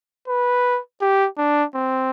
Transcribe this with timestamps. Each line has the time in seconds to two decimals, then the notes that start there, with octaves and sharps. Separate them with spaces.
0.28 B4
1.01 G4
1.38 D4
1.75 C4